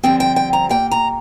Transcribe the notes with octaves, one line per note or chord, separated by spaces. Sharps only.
G2 D3 F3 C4 G5
G5
G5
A#5
A#2 A#3 G5
A#5